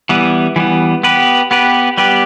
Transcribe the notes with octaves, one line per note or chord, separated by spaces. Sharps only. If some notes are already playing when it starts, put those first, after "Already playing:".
E3 G3 B3
E3 G3 B3
B3 G4 B4
B3 G4 B4
G3 B3 G4 B4